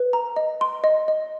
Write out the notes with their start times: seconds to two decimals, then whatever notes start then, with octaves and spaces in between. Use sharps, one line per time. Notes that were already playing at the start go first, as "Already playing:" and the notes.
Already playing: B4
0.13 A#5
0.36 D#5
0.61 C6
0.84 D#5
1.08 D#5